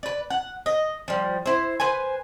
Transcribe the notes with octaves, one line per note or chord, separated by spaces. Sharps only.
B4 D5
F#5
D#5
F3 G3
E4 C5
B4 C5 G#5